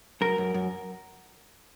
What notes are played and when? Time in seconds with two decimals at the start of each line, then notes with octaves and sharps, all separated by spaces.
0.21 F#2 A#4
0.38 F#2
0.54 F#2